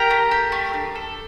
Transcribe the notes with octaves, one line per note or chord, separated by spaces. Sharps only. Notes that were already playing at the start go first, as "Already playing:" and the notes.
Already playing: G4 A#4 A#5
A3
G4
A3
D4
A4